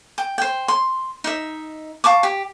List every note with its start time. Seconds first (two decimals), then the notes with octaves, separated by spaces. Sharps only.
0.18 G5
0.38 C5 G5
0.68 C6
1.24 D#4 E5
2.04 F5 A5 C#6 D6
2.23 G4